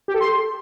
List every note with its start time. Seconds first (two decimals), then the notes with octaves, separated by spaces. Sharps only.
0.08 G4
0.14 A4
0.21 C6